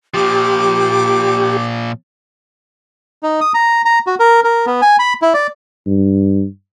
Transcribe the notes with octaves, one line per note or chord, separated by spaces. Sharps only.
A#2 F3 G4 D6
D#4
D#6
A#5
A#5
F#4
A#4
A#4
B3
G#5
B5
E4
D5
G2